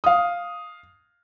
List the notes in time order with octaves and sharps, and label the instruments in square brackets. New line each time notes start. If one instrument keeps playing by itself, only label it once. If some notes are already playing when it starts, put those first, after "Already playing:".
[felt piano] F5 D#6